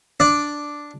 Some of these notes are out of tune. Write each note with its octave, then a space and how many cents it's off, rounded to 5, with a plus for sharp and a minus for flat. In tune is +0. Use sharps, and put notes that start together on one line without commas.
D4 +0 D5 +0